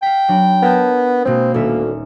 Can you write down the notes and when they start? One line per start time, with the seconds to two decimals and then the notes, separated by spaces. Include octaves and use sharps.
0.02 F5 G5 B6
0.28 F#3 D4 B5
0.62 B3 A#4 A5 G6
1.25 B2 G#3 A#3 C4
1.54 D#1 D2 C#4 E5